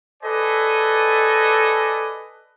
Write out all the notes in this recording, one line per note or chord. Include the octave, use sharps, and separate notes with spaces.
A4 B4 D5 D#5 G#5